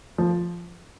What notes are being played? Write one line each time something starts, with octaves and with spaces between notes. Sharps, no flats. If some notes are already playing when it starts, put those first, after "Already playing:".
F3